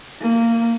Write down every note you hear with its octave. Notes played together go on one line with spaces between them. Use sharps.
A#3